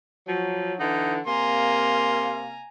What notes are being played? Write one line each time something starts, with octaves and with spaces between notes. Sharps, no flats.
F3 F#3
D3 E3 D#4 F#5
C3 A#3 F5 G#5 A#5 C6